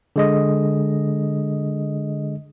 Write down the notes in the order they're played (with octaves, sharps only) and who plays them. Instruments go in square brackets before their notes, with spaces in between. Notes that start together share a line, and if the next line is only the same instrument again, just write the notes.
[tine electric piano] D3 G#3 D#5